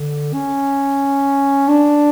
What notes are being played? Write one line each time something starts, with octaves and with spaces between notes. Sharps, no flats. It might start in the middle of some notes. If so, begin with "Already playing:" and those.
Already playing: D3
C#4
D4